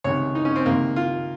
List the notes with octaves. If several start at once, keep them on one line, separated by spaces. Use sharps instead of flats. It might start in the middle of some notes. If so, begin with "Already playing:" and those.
C#2 C3 D#3 C#5
D#4
C#4
C4
C#2 C3 D#3 A#3
F4